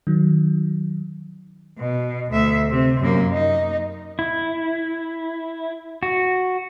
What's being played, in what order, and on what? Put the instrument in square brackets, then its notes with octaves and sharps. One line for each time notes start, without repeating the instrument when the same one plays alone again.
[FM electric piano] D#3 F#3
[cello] B2
D2 E5
C3
F#2 A#3
D#4
[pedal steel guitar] E4
F#4